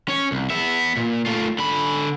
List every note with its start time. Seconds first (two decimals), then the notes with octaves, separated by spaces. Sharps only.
0.08 C#4 C#5
0.32 C2
0.50 B3 E5
0.97 A#2
1.26 A3 F4
1.58 D3 B5